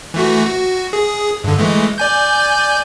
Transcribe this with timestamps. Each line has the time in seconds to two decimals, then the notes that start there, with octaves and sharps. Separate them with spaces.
0.14 E3 A3 F#4
0.46 F#4
0.93 G#4
1.44 G2 D3
1.58 E3 G#3 A3
1.98 D5 G#5 G6